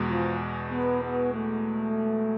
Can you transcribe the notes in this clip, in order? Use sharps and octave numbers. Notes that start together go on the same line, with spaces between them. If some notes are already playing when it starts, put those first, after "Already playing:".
Already playing: E2 B2 G#3
F3
B3
B3
A3